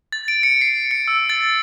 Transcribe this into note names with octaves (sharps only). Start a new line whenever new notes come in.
A6
D7
C#7
C7
C#7
E6
A6